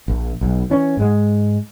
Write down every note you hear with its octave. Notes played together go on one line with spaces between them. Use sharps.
A#1
B1
E3 C#4
G#2 G#3